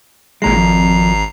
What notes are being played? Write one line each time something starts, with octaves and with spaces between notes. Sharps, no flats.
G#1 A#2 G#3 A#5 C7
F2